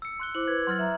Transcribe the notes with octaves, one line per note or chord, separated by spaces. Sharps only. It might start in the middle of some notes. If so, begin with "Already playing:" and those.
E6 C#7
C6 F#6 G7
E4 C5 D6 F#7
B4 D6 G#6
F#3 C6 F6 A6
E5 A#5